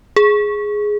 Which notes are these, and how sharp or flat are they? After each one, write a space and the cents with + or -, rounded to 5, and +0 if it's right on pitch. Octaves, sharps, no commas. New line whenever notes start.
G#4 +5